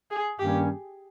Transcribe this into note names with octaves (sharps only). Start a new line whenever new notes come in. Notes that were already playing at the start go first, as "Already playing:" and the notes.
G#4
G2 D#3 G3 A#3 C#4 G4